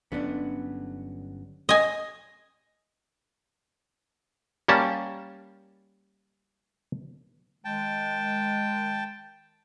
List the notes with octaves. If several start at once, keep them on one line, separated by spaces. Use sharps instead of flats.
G1 F#3 B3 C#4 D4
D#5 G#5
G3 A#3 C#4 A5
D#3 G#3 G5 A5